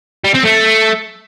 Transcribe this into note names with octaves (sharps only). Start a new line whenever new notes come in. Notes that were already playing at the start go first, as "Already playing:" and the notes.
G3
C4
A3